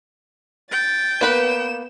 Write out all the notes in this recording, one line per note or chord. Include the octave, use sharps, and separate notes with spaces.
G5 A6
A#3 B3 B4 B5 E7